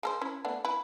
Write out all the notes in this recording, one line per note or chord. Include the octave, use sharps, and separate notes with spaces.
G#3 A4 C5
C#4 E4
A3 B3 D4
E4 B4